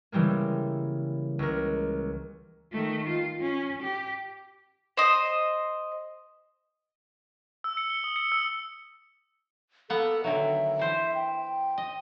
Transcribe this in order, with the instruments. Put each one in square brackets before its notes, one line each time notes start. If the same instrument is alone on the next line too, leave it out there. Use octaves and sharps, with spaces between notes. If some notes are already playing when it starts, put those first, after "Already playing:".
[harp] C#3 E3 G3 G#3 A#3
C#2 A#4
[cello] D#3 A3
F4
C#4
G4
[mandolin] C5 D#5
[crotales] E6
C#7
G7
D#6
C#7
E6
[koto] A#3 B3 F#5 [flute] A4
[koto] D3 D#3 F#3 [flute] E5
[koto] E3 C5
[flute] G5
[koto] D#5